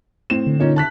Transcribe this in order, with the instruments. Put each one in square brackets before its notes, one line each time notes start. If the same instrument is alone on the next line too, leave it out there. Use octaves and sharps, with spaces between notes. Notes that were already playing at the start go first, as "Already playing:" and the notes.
[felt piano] A2 C4 E7
[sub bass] D3
[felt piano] A#2 C#4 D#4
A5 F#6 B6